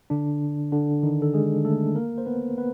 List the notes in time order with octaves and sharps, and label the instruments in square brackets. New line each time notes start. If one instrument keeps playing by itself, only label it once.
[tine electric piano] D3 D4
D3 D4
D#3 D#4
A4
G#3 G#4
A3 A4
A#3 A#4
C5
B3 B4
B3 B4